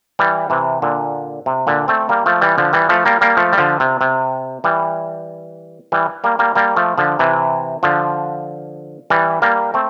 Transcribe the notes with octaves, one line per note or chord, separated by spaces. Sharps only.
E3 G3
C3 E3
A#2 D3
C3
A#2 D3
A3 C4
G3 A#3
F3 A3
E3 G3
D3 F3
E3 G3
F3 A3
G3 A#3
G3 A#3
F3 A3
G3
D3 F3
C3
C3
E3 G3
E3 G3
G3 A#3
G3 A#3
G3 A#3
F3 A3
D3 F3
C3 E3
D3 F3
E3 G3
G3 A#3
A3 C4